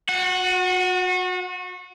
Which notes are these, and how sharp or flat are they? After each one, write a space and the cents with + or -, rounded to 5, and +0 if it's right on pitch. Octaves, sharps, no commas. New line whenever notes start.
F#4 -35 F#5 +0